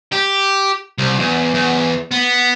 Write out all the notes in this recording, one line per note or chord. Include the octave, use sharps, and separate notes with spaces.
G4
C2
E2
E2
B3